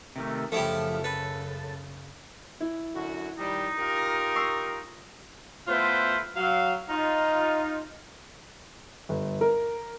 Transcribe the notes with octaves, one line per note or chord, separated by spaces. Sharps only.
C3 D#3 A3
F#2 C#3 F3 A3 E4 G4
A4 B4
E4
F#2 D3 F#4
D#3 F3 G3 D#4
F4 G4 A#4
C#6 E6 C7
A3 B3 E4 F4 B4 C5
F#3 F5
D#4 F4
G1
A#4